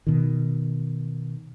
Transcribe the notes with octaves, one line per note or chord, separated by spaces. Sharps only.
B2 D#3